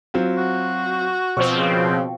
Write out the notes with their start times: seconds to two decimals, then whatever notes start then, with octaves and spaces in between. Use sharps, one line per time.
0.14 F#3 C4 F4
0.37 F#4
1.37 B2 F3 C4 C#6
1.54 C#3